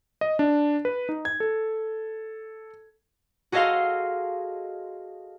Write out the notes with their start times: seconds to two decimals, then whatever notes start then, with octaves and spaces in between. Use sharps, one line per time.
0.21 D#5
0.39 D4
0.85 B4
1.09 D#4
1.25 G#6
1.40 A4
3.52 F#4 G#4 A4 D#5 F5 C6